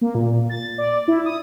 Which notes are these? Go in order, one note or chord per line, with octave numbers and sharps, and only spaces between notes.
A#3
A#2
A6
D5
E4
D#6